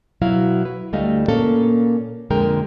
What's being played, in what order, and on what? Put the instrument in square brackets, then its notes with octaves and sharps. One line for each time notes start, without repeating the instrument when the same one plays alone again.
[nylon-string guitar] B2 F#3 E4 F#4 F5
B4
D2 G3 A3 D#5 F5
A#2 A#3 C#4 A4 F5
F2 A#2 D3 G#3 A#4 G5